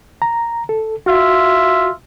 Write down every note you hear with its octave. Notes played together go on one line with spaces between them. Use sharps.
A#5
A4
F4 F#4 E5